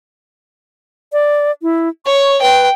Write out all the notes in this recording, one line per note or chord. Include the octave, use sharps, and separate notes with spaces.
D5
E4
C#5 C#6
B4 G5